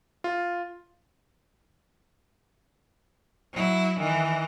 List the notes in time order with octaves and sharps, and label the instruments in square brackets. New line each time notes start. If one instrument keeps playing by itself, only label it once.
[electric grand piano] F4
[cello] F#3 E4
D#3 E3